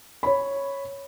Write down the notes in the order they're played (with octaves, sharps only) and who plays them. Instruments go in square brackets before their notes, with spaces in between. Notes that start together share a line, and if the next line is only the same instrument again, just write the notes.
[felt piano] C#5 B5